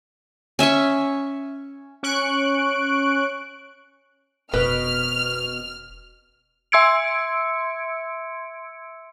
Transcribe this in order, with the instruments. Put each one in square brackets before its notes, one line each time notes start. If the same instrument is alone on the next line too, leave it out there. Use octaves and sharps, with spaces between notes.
[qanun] C#4 E5 G#5 C#6
[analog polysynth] C#4 C#6 F#6 D7
[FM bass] F1 [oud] B2 [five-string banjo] B4 [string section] F6
[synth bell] E5 C6 E6 G#6 C#7 D7